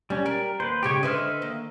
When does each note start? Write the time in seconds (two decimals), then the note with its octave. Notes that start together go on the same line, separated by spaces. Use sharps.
0.10 G3 C#4 D4
0.26 G3 A#4
0.60 D#2 B4 C5
0.83 G#2 C#3 G#3 G4 C#5
1.03 D3 B4 C5 D#5 E5 F6
1.42 D#3 A#3